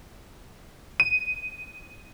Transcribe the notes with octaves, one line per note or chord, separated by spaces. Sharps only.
D#7